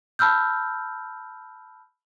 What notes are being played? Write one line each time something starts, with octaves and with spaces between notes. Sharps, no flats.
A5 B5 E6 F6 G6